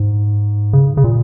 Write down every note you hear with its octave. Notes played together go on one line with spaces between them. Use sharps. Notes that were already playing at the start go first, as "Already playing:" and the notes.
Already playing: G#2
C#3
C#3
A#2